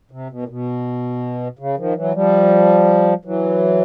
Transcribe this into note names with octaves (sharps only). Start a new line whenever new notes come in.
C3
B2
A#2
B2
C#3
D#3 F3
E3 F#3
F3 G3
E3 F#3